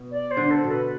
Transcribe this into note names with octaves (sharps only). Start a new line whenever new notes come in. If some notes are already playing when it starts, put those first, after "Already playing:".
Already playing: B2
D5
C5
D3
A4
B2
B4